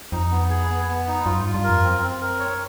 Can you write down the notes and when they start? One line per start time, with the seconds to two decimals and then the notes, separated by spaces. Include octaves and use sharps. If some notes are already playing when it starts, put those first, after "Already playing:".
0.12 F2 D#4
0.31 B3
0.50 G#4
0.69 B3
0.88 B3
1.08 D#4
1.25 F#2 F4
1.40 G2 F4
1.54 G2
1.63 A#4
1.69 F2
1.83 F#2 C4
2.02 C4
2.21 A#4
2.39 C#5